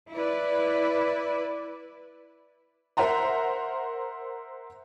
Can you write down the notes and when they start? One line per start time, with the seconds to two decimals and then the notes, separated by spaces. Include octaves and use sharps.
0.12 E4 B4 D5
2.97 A#4 C5 E5 F#5 A#5 C6